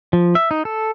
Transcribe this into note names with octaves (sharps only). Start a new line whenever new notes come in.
F3
E5
D#4
A4